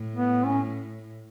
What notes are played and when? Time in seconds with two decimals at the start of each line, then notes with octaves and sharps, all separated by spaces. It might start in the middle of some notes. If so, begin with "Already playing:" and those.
Already playing: A2
0.14 B3
0.45 C#4